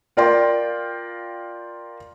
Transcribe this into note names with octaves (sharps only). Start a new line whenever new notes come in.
F4 A#4 D5 G5 C6